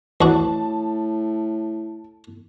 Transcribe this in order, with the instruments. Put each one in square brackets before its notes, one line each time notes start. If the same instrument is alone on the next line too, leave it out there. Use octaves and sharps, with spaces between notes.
[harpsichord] E2 F#4 [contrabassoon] A2 [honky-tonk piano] A5